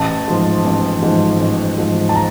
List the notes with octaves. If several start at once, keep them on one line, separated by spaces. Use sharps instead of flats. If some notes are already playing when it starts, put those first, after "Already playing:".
Already playing: A1 A5
G#2 F3
A1
G#2 F3
A1
G#2 F3
A5
A#5